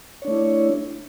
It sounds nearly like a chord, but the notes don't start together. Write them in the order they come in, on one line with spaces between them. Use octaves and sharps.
C#5 D4 A3 E4